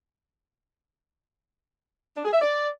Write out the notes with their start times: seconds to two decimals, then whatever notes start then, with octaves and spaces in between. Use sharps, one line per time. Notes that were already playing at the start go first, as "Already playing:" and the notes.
2.16 D4
2.25 G#4
2.33 E5
2.41 D5